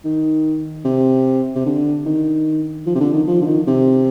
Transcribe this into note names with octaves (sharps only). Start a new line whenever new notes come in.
D#3
C3
C3
D3
D#3
F3
C3
D3
D#3
F3
D3
D#3
C3